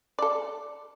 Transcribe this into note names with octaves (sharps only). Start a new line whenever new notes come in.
A4 D5